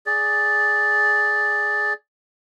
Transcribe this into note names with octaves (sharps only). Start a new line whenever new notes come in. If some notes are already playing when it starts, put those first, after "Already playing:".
G#4 D5